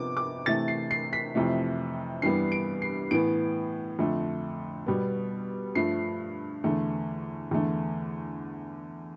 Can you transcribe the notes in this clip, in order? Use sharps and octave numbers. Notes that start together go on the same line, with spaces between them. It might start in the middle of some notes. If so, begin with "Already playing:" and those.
Already playing: C3 F3 B3 D6
D6
C3 E3 A3 A6
C7
C7
B6
F2 C3 E3 A3
G2 E3 G3 B3 C7
D7
C7
A2 E3 B3 D7
F2 D3 A3
B2 G3 B3
G2 F3 A3 C7
E2 D3 A3
E2 D3 A3